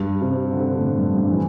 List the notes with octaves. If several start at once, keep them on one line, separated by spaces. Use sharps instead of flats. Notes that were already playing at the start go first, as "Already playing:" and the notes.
Already playing: G2
C3
D3
C3
A2
G2
G2
E3